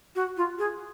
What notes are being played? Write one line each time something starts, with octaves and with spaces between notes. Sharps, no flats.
F#4
F4
G#4